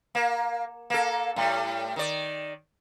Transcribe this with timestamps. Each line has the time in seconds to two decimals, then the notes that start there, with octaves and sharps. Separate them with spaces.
0.15 A#3
0.90 A#3 A4
1.36 A2 G3
1.96 D#3 D5